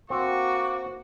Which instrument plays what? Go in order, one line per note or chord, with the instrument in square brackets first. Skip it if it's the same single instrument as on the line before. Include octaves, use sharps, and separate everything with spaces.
[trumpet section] A#3 D6 [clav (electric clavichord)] C4 [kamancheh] F#4 [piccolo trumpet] C#6